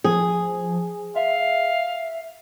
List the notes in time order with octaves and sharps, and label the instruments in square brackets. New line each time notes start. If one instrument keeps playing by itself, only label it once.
[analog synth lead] F3 [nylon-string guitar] G#4
[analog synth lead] E5 [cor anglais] F5